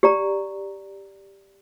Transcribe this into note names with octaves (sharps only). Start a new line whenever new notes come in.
G4 D5 A#5